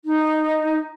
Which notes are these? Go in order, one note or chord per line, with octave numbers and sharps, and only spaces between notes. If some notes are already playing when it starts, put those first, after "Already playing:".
D#4